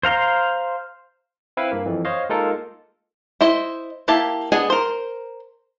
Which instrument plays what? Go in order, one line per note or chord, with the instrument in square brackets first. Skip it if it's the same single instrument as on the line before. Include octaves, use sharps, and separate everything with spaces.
[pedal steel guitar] C5 F5 A#5 C6
[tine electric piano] C4 E4 B4 E5 F5
G2 A#3
F2 E3
C5 C#5 D#5 F5
G#3 A#3 D#4 F4 A4 A#4
[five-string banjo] E4 C5 D#5
A#3 E4 G4 G5 A5
B3 D4 G#4 D#5 G#5
A#4 C5